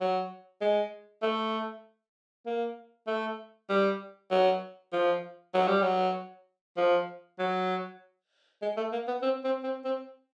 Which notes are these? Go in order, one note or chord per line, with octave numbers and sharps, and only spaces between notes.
F#3
G#3
A3
A#3
A3
G3
F#3
F3
F#3
G3
F#3
F3
F#3
G#3
A3
A#3
B3
C4
C4
C4
C4